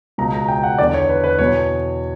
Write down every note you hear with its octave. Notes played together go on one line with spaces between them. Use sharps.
C#2 B2 A#5
A#5
G5
F#5
E2 D3 D5
C#5
B4
B4
E2 B2 C#5